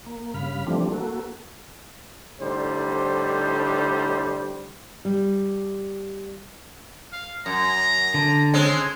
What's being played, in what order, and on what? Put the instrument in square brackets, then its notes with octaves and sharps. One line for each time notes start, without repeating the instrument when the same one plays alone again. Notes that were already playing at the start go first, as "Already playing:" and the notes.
[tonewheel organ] A#3
G2 C#3 F5 B5
E3 F3 G3 A3 C4 D4
A#3 F#4 A4
[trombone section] A2 D3 G3 D#4 C5
[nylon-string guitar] G3
[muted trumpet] F5
[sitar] F#2 [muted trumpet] A#5
[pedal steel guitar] D3
[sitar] G#3 C4 C#4